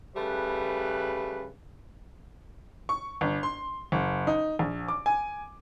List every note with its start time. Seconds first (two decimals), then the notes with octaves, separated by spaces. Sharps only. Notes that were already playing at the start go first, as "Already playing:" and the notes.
0.16 C#3 G3 A3 B4
2.89 C#6
3.21 G1
3.43 C6
3.92 F#1
4.27 D#4
4.59 A#1
4.88 D6
5.06 G#5